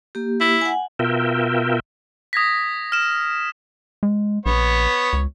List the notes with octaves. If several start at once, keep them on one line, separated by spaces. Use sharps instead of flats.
A#3 G4
E4
F#5 G#5
B2 F4 A#4 E5 G5
D#6 G#6 A#6 B6
F6 E7
G#3
A#1 B3 C#5
C#2